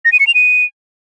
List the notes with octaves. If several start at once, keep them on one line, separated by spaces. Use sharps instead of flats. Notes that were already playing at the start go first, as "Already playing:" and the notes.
A#6
D#7
C#7
F7
D#7